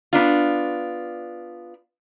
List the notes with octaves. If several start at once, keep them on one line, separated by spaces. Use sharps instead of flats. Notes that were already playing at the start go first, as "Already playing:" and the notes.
B3 D4 F4